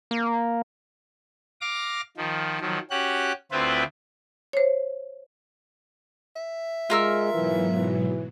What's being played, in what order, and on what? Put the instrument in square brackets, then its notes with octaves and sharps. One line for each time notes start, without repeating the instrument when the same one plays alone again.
[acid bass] A#3
[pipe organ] F5 D6 A#6
D#3 F3
D#3 F3 F#3
C#4 F#4 G4 F#6
D2 C4 E4 F4 B4 C5
[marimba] C5 C#5
[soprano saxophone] E5
[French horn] G#3 [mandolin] F4 A#4 E6
[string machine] G#2 B2 F#3 [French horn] E3
[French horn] E3